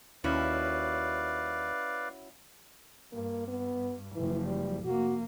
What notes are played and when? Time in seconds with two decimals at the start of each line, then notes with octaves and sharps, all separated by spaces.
0.24 D#2 C#4 E4 F#4 B4 D5 F5
3.12 G2 A#3
3.48 B3
4.16 F#1 E3 F3
4.46 G3
4.85 F1 A#3 F#4